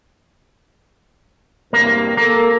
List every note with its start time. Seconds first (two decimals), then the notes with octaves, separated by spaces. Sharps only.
1.73 E2 G2 C3 A#3
2.17 A#3 A4 A#4